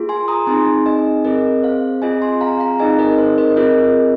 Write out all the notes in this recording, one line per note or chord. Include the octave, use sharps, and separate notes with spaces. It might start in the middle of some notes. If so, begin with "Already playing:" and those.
Already playing: A#3 F4 G#4
G#5 C6
A#5 D#6
C4 D#4 G#4 G#5 C6
D#5 G#5
C4 G#4 A#4 D#5
C5 F5
C4 F4 G#4 D#5 G#5
G#5 C6
F5 A#5
F5 A#5
C4 D#4 G#4 D#5 G#5
A#4 D#5
C5
A#4 D#5
C4 F4 G#4 A#4 D#5